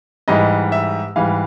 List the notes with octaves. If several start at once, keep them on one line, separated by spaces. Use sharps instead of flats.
G#2 E3 G3 D#5
E5
G#2 E3 G3 F5